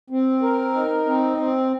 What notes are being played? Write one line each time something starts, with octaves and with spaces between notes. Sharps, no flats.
C4
A#4
D#4
C4
C4